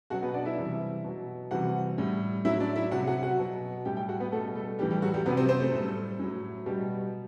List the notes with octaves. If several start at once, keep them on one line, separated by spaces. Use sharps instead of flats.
B2 F#3 F#4 F#5
B3 B4
D4 D5
E4 E5
C3 E3 G3
B2 F#3
C3 E3 G3 F#4 F#5
A2 G3
A2 F#3 E4 E5
D4 D5
E4 E5
C3 F#3 F#4 F#5
F#4 F#5
F#4 F#5
B2 F#3
A2 G3 G4 G5
G4 G5
F#4 F#5
B3 B4
B2 G3 A3 A4
A3 A4
A2 E3 G3 G4
G3 G4
F#3 F#4
G3 G4
C3 F#3 B3 B4
C4 C5
C4 C5
A3 A4
A2 G3
A2 F#3
B2 F#3 G3 G4